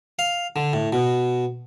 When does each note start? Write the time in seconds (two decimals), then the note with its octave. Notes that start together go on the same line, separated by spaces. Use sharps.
0.19 F5
0.56 D3
0.73 A2
0.93 B2